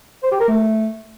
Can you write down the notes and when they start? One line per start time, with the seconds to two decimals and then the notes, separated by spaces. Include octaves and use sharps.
0.23 C5
0.31 G4
0.40 A#4
0.48 A3